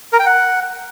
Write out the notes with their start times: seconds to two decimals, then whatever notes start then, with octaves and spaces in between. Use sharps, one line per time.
0.13 A#4
0.19 G5
0.26 F#5